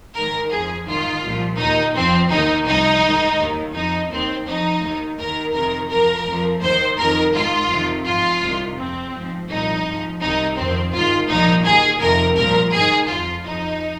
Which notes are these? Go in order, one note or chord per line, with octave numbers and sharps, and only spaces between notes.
G#2 D#3 A#4
F2 F3 G#4
G#2 D#3 F4
C2 A#2 F3
D#2 D#3 D#4
F2 F3 C4
D#2 D#3 D#4
C2 C3 F3 D#4
G#2 D#3
D#2 D#3
F2 F3 D#4
D#2 D#3 C4
F2 F3 D#4
D#2 D#3
D#2 D#3 A#4
F2 C3 D#3 A#4
F2 F3 A#4
F2 F3
D#2 D#3 C5
F2 D#3 A#4
G#2 D#3 F4
F2 C3 D#3
G#2 F3 F4
C2 C3 D#3
F2 F3 C4
G#2 F3
C2 A#2 F3 D#4
G#2 F3
C2 C3 D#3 D#4
F2 D#3 C4
G#2 D#3 F4
C2 A#2 F3 D#4
D#2 D#3 G#4
F2 C3 D#3 A#4
C2 A#2 F3 A#4
G#2 D#3 G#4
F2 F3 F4
F2 F3 D#4